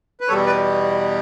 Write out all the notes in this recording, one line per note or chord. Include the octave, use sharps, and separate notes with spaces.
B4
E2 B2 G3 A4 C#5
B4 D5